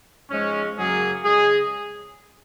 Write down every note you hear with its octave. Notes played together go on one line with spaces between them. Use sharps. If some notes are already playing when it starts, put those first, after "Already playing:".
G#2 F3 G#3 C#4
F#2 C#3 F#3 A#3 G#4
C#3 G#3 G#4